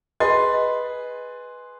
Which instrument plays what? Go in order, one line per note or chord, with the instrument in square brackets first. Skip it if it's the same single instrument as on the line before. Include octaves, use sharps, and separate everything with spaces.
[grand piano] G#4 B4 C6 [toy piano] D#5